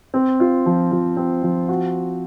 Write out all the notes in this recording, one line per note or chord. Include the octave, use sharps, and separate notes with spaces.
C4
F4
F3
F3
C4
F3
F#4